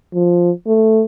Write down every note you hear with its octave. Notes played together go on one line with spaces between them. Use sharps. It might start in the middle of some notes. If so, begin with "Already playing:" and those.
F3
A3